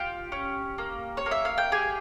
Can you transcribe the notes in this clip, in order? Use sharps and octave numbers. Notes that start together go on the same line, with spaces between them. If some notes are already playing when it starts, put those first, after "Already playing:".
Already playing: F4 G4 G5
C#4
A#3
C#5
A#3
E5
F5
G5
G4 G#4 G#5